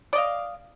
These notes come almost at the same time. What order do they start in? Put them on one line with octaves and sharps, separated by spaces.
D5 D#5 F5